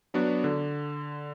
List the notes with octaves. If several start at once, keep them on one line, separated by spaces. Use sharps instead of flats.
F#3 B3 D4 F#4
D3